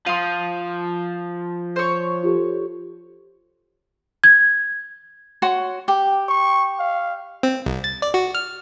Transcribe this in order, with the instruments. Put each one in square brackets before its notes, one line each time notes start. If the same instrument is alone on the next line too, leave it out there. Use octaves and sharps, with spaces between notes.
[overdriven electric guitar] F3 [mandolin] F5 C6 [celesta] D#6 D#7
[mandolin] C5 C#5
[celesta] F4 G4 A4
G#6
[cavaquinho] F#4 C#5 C6
G4 G5
[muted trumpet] C#6
F5
[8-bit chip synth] C4
C2
A6
D5
F#4
F6